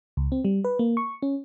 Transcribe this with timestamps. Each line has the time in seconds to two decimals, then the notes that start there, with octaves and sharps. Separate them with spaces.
0.17 C#2
0.32 C4
0.45 G3
0.64 B4
0.79 A#3
0.97 C#6
1.22 C#4